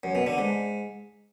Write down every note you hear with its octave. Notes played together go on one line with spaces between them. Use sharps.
F#2
B2
D3
G#2